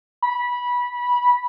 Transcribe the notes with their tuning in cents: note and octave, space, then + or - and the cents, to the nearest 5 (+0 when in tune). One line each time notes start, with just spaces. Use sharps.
B5 -20